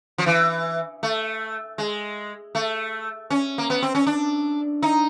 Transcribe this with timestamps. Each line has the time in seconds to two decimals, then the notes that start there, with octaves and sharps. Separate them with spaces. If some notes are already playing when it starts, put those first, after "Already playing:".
0.18 F3
0.26 E3
1.03 A3
1.78 G#3
2.55 A3
3.30 C#4
3.58 A#3
3.70 B3
3.82 C4
3.95 C#4
4.07 D4
4.83 D#4